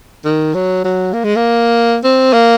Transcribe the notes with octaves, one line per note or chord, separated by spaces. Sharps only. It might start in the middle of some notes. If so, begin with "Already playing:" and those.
D#3
F#3
F#3
A#3
G#3
A#3
C4
A#3